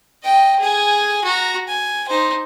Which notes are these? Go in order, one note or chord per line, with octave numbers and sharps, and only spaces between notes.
D#5 G5
G#4 G#5
F#4 A#5
G#5
D#4 C5